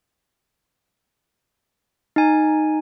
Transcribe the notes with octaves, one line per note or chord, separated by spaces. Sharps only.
D#4 G#5